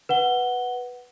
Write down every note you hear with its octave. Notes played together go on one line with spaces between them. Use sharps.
B4 F#5 G7